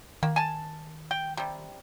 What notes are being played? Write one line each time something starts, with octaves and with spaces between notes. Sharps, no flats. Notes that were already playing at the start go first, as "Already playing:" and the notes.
D#3 A#3
G#5 A5
G5
C3 G3